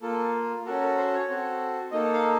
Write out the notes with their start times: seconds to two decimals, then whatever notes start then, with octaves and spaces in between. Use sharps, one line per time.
0.02 A#3 F4 A4
0.65 C#4 F#4 A4 A#4
0.81 A#4
0.97 C5
1.13 C#5
1.28 C4 F#4 A4
1.91 A#3 D#4 A4 D#5
2.14 F5